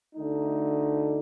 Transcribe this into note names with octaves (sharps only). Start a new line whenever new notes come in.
D2 D3 A3 D#4